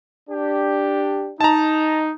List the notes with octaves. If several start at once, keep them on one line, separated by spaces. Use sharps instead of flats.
D4 G4
D#4 A5 A#5